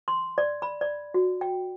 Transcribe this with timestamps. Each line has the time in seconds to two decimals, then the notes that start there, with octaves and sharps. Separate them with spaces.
0.08 C6
0.38 D5
0.62 B5
0.81 D5
1.14 F#4
1.41 G5